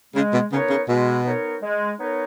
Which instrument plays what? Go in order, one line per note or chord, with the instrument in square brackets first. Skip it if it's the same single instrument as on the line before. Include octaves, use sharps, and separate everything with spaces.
[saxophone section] C#3 [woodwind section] G#3
[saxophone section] B2
[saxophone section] C#3 [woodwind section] B3 D#4 A#4 C#5
[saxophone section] C#3
[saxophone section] B2 [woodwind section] G#3
[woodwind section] B3 D#4 A#4 C#5
G#3
B3 D#4 A#4 C#5